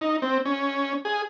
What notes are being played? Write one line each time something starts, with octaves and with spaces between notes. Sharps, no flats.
D#4
C4
C#4
G#4